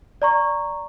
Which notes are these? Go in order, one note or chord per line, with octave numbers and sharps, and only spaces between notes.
D5 A#5 C#6